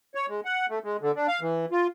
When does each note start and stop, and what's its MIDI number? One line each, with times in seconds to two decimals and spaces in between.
0.15 0.26 73
0.28 0.41 56
0.45 0.66 78
0.70 0.79 57
0.84 0.97 56
1.01 1.11 50
1.15 1.27 62
1.28 1.40 77
1.41 1.66 52
1.72 1.87 65